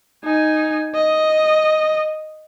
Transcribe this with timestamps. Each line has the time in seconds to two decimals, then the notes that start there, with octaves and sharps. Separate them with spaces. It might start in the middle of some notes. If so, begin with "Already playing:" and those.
0.25 D#4 G#5
0.95 D#5